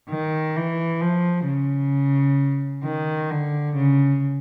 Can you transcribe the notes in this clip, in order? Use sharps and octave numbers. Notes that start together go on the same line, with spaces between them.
D#3
E3
F3
C#3
D#3
D3
C#3